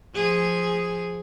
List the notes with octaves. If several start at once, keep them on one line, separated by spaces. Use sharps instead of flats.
F3 G#4